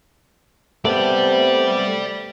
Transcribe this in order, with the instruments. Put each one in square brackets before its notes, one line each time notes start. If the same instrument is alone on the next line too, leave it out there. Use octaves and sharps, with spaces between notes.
[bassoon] C3 [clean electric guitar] A3 B3 [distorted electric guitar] D5 G5